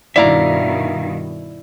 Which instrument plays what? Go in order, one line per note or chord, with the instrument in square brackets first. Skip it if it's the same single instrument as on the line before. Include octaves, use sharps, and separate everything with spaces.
[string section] G2 B2 D#3 [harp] E4 D5 [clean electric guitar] E5 F5 A#5